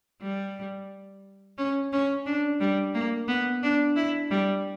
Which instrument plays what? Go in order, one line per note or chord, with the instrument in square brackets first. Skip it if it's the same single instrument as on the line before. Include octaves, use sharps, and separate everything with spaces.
[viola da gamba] G3
C#4
C#4
D4
G3
A#3
B3
D4
E4
G3